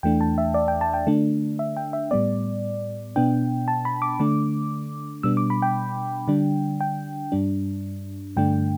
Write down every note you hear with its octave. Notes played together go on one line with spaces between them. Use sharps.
E2 E3 A3 D4 G5
A5
E5
D5
G5
A5
G5
D3 A3 D4
E5
G5
E5
A2 G3 B3 D5
B2 B3 D4 G5
A5
B5
D6
D3 A3 D4
B2 G3 B3 D4 E6
D6
B5
G5
D3 G3 D4
G5
G2 G3 D4
G2 D3 A3 D4 G5